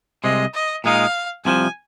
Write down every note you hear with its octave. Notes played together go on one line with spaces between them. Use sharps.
C2 C3 G#3 D#5
D#5
A#2 G#3 D#4 F5
C2 C3 F3 G#5